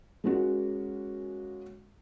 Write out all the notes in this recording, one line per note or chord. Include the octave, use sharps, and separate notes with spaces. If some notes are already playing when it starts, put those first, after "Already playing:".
G#3 A#3 C#4 F#4